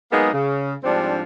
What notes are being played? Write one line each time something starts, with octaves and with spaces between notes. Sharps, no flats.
F#3 G#3 A#3 B3 D#4 G#4
C#3
G#2 F3 G3 C4 D4